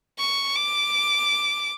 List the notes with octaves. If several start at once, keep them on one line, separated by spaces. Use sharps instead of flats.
C#6
D6